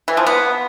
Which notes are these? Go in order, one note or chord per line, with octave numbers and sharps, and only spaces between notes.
E3
F3
B3